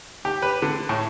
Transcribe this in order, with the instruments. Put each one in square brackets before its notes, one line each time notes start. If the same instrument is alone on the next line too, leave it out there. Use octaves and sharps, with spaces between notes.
[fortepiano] G4
B4
D3
A2